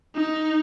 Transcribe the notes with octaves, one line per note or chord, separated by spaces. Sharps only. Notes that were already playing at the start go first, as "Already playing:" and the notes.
D#4